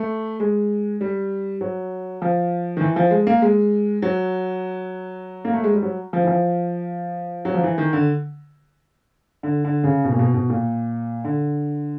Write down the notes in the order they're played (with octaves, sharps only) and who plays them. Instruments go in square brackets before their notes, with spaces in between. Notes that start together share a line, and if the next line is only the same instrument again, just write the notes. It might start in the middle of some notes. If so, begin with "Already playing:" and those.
Already playing: [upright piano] A3
G#3
G3
F#3
F3
D#3
E3
F3
G#3
A#3
G#3
F#3
A#3
A3
G#3
G3
F#3
F3
E3
F3
F#3
F3
E3
D#3
D3
D3
D3
C#3
B2
A#2
B2
B2
A#2
D3